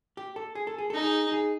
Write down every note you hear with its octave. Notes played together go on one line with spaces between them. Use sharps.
G4
A4
G#4
A4
G#4
D#4 A4
G#4
G#4